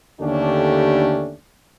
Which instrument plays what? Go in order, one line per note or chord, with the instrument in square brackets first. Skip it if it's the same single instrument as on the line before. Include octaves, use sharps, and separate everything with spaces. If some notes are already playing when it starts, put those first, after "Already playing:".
[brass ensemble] D#2 D3 A3 C#4 D4 G4